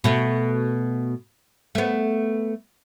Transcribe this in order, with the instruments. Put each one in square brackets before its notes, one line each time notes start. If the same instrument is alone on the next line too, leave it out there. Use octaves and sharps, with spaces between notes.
[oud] B2 A3
A3 B3